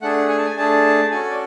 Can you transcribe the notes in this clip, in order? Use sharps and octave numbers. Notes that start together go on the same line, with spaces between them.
A3 D4 G#4 F#5
G#5
A5
G#5
A3 D4 G#4 A5
C#4 F#4 A4 G#5
D5